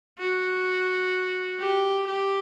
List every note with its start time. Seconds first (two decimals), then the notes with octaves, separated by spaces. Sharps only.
0.19 F#4
1.60 G4
2.07 G4